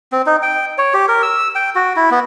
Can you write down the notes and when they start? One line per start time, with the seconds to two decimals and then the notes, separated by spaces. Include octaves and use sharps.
0.12 C4
0.26 D#4
0.42 G5
0.78 C#5
0.94 G4
1.08 A#4
1.23 E6
1.55 G5
1.75 F#4
1.96 E4
2.11 B3